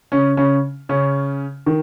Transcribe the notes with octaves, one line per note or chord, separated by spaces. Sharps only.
C#3 C#4
C#3 C#4
C#3 C#4
D#3